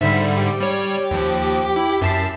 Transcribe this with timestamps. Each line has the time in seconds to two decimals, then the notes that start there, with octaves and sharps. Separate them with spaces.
0.01 G#2 D3 G3 E5
0.36 G4
0.60 G3 C#5
1.11 D#2 F3
1.76 E4
2.02 F#2 E5 A5 C7